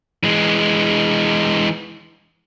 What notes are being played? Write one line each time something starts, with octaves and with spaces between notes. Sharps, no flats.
E3 G#3